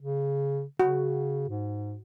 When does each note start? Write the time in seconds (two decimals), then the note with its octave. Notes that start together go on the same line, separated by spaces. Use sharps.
0.01 C#3
0.80 C#3 F#4
1.49 G#2